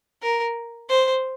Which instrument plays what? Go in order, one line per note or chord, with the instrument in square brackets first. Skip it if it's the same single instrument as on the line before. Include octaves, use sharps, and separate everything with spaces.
[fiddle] A#4
C5